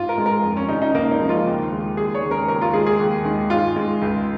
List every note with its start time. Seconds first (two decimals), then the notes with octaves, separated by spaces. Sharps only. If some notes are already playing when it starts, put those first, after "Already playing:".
Already playing: G#2 F4
0.09 A#4
0.18 G#3
0.26 A#4
0.43 F2
0.57 C#4
0.69 C#3 F3 D#4
0.82 D#4
0.94 C#2 A#3
1.11 D#4
1.20 C#3 F3 G#3
1.29 F4
1.46 D#2
1.72 D#3 G#3
1.97 D#2 G#4
2.15 C#5
2.22 C#3 G#3
2.31 A#4
2.48 D#2 A#4
2.61 F4
2.74 D#3 G#3 G#4
2.87 G#4
3.00 D#2
3.25 D#3 G#3
3.50 G#2 F4
3.76 G#3
4.02 C#2